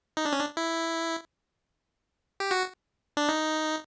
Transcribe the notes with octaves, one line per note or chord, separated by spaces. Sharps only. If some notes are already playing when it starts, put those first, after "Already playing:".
D#4
D4
C#4
D4
E4
G4
F#4
D4
D#4